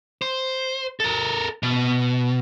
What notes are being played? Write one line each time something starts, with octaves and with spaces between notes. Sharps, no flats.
C5
A4 A#4
B2